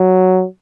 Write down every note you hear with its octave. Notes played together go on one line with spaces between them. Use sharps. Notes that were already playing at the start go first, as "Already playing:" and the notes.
Already playing: F#3